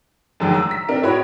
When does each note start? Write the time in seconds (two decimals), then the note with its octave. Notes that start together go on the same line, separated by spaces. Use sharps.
0.40 F#2 D3 D#3 F#3 G#3
0.54 A#5 E6
0.71 B6
0.89 C4 D4 A#4
1.02 A2 F#4 C#5 B5 D7